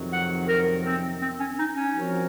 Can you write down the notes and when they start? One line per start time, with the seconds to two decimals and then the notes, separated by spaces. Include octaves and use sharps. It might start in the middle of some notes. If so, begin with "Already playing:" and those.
Already playing: F2 C3 D#3 F#3
0.13 F#5
0.49 A#4
0.85 C4
1.22 C4
1.40 C#4
1.59 D#4
1.76 C#4
1.95 F3 C4 F#4 A#4 C#5